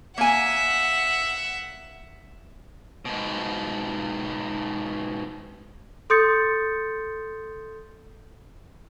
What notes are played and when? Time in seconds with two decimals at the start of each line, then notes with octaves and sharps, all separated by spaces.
0.18 A#3 E5 F#5 G#5
3.05 G#2 B2
6.10 A4 C6 D#6 G6 A6 C#7